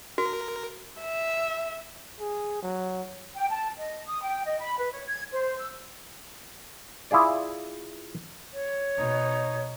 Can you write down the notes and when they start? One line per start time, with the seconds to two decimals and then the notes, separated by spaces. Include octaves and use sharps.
0.18 F#4 A#4
1.00 E5
2.20 G#4
2.62 F#3
3.35 G5
3.49 A5
3.78 D#5
4.05 D#6
4.23 G5
4.46 D#5
4.60 B5
4.78 B4
4.91 C#5
5.08 G#6
5.32 C5
5.59 E6
7.11 E4 F4 G#4 D5
8.53 C#5
8.98 B2 D#4